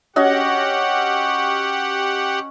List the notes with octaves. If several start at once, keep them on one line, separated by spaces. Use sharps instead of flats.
C#4 F#4 G4 D#5 F#5